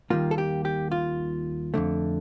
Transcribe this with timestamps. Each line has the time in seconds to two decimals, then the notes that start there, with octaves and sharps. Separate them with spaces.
0.10 D#2 D#3 G3 A#3 F4
0.31 A4
0.38 G4
0.65 G4
0.92 F4
1.74 F2 D3 A3